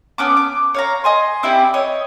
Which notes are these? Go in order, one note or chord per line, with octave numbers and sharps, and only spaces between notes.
B3 C#4 D6
D6
C#5 F5 A#5
D#5 G#5 C6
C4 E4 G4 D5
C#5 D#5